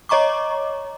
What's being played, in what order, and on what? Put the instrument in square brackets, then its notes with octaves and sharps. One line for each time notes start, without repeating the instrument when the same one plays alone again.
[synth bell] C#5 D#5 A#5 C#6 D6